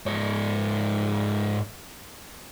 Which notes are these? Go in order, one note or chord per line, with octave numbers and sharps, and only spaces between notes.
G#2 C#5